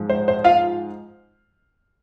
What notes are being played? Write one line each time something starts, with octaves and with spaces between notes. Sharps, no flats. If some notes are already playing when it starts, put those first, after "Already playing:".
Already playing: G#2 F3 G#3
C5
C5
F4 F5